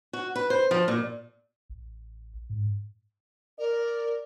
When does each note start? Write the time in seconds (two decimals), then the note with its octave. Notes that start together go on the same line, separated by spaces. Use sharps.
0.13 F#4
0.36 B4
0.50 C5
0.71 F3
0.88 A#2
1.70 A1
2.50 G#2
3.59 A#4 D5